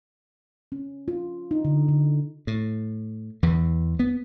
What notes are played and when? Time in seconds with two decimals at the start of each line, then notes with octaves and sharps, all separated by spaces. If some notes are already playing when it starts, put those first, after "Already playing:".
0.72 C#4
1.08 F4
1.51 D#4
1.65 D3
1.88 D3
2.47 A2
3.43 E2 E3
3.99 B3